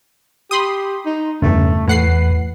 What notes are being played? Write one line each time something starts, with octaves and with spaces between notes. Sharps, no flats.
G4 B5 C6 D#6
D#4
E2 G2 C#3 A3
E2 A2 B4 F#5 C7